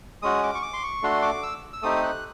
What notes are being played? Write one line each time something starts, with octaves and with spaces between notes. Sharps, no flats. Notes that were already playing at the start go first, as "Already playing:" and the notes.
G#3 C#4 F#4 D#6
D6
C#6
D6
C6
C#6
A3 D4 F#4 C6
D6
E6
E6
A3 C4 D#4 G4 D#6
F#6